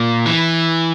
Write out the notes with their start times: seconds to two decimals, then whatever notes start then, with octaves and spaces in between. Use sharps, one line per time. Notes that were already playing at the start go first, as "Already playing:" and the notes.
Already playing: A#2
0.26 E3